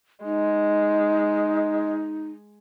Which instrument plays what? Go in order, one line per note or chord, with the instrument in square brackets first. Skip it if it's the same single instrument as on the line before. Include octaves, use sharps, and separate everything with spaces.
[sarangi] G#3 [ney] D#4